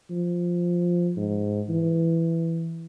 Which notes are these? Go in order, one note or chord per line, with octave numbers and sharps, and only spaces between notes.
F3
G#2
E3